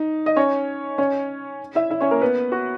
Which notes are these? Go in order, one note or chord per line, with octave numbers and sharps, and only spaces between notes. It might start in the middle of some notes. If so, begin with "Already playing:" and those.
Already playing: D#4
D#5
C#4 C#5
C#4 C#5
E4 E5
E4 E5
C#4 C#5
A#3 A#4
B3 B4
F#4